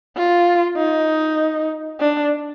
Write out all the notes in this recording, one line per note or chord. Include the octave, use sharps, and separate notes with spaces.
F4
D#4
D4